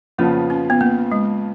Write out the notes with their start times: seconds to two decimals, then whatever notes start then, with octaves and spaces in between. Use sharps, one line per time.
0.18 F2 C#3 F3 A#3 B3 F4
0.50 C#4
0.70 B3
0.81 A#3
1.12 G#3